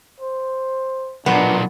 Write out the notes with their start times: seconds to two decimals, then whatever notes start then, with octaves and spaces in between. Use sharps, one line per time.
0.20 C5
1.26 B1 A#2 B3 D4